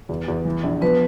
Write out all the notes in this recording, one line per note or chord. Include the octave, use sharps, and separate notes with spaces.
E2
E2
E3
A#1
F3 B3 B4